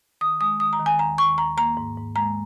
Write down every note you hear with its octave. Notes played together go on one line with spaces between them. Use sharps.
D#3 D#6
G#3 D#6
D#3 D#6
A#5
D#3
G#5
D#2 A#5
D#3 C#6
D#2 A#5
A#3 A#5
G#2
G#2
G#3 A#5